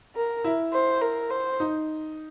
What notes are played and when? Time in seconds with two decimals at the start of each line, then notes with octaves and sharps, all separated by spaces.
0.16 A#4
0.44 E4
0.73 C5
1.02 A#4
1.31 C5
1.60 D#4